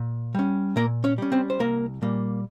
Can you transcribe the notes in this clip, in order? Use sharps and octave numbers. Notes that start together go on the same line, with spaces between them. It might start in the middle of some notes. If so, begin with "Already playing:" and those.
Already playing: A#2
G3 C#4
A#2 A#3 A#4
C#4 C#5
G3 C#4
C4 C5
C5
C2 A#3 A#4
A#2 G3 A#3